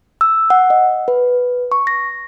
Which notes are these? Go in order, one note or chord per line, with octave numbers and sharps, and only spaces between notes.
E6
F#5
D#5
B4
C#6
A#6